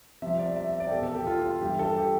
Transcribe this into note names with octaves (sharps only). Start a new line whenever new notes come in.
C2 C3 F3 E5
D5
E5
E5
D5
G4
E2 B2 A4
A4
G4
F4
F4
G2 E3 G4
A4
G4